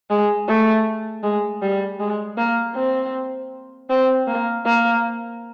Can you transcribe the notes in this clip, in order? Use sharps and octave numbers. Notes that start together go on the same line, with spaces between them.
G#3
A3
G#3
G3
G#3
A#3
C4
C4
A#3
A#3